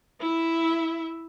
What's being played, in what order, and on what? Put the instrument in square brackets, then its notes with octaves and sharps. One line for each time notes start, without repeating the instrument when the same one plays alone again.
[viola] E4 E5